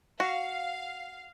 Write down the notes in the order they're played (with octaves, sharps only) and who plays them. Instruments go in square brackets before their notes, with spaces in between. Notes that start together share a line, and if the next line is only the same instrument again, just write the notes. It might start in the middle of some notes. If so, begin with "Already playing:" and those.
[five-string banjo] F#4 [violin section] F5